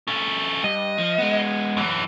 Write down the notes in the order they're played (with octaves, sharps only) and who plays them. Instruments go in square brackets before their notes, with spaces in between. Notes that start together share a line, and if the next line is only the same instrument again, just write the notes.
[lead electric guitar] C#4 A4
[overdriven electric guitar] G2 [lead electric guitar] D#5
[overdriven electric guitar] F3
G#3 B3
[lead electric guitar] F#2 E3